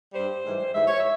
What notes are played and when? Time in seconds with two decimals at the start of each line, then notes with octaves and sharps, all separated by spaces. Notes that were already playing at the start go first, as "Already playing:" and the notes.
0.14 G2 G3 C5
0.44 G#2 E3 G3
0.75 G#2 E3 G3 E5
0.87 C#5
1.00 E5